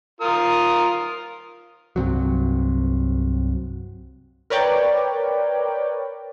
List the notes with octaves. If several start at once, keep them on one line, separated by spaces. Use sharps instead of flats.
F4 A#4 D#6
C2 G2 C3 F#3
A#4 B4 C#5 D5 G5